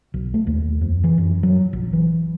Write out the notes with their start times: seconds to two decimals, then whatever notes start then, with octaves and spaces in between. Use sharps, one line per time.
0.14 B1
0.34 A3
0.47 D#2
0.81 F2
1.04 E3
1.18 F#2
1.43 F#3
1.73 A#1
1.93 E3